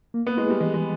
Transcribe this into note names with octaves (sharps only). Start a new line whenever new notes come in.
A#3
B3
G#3 E4 G#4 B4
G3
E3 G#3
G#3